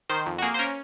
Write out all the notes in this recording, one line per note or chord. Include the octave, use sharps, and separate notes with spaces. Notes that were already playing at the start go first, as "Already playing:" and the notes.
D#3 C5
F2
F#4
A#3 G#4
C5
C#4 A#4